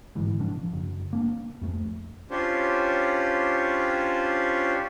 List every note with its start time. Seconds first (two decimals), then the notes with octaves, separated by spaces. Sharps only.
0.15 G1 G#2 E3
0.39 C3 F3 D4
0.73 F#1
1.13 A#3 C#4 D4
1.61 F2 A3
2.31 C#4 D4 F4 G4 C5 C#5